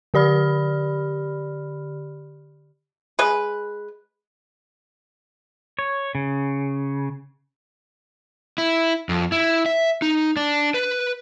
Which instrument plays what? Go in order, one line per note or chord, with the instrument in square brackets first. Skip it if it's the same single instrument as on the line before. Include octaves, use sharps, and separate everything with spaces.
[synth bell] D3 G4 D5 B5 F6
[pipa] G#3 B4
[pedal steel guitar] C#5
C#3
[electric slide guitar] E4
F2
E4
E5
D#4
D4
B4